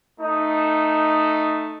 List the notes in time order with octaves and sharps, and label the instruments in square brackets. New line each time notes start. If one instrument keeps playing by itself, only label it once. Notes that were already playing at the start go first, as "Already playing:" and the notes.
[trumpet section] A3 D#4